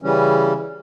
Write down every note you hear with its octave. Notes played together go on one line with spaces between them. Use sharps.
C#3 E3 G3 C#4